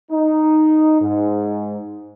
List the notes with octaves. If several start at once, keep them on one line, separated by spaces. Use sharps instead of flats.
D#4
G#2